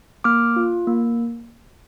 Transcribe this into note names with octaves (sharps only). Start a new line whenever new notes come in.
A#3 D6 F6
F4
A#3